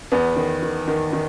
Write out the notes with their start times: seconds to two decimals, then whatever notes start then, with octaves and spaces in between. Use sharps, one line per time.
0.12 E2 B3
0.36 D#3
0.62 D#3
0.88 D#3
1.13 D#3